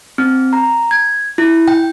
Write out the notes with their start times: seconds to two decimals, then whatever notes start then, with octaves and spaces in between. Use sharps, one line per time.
0.18 C4
0.53 A#5
0.91 G#6
1.38 E4
1.68 G5